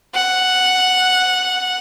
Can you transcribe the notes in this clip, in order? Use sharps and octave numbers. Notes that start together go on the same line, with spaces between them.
F#5